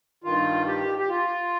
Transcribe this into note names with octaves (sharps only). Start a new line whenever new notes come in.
G2 D#3 F4
G4
G4
F4